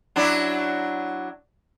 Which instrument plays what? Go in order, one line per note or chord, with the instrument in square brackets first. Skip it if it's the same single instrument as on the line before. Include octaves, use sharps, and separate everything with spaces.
[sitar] F#3 D4 E4